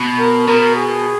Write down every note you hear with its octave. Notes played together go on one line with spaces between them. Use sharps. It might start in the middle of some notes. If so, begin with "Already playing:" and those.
Already playing: B2
A#4
B2 A#4
G#4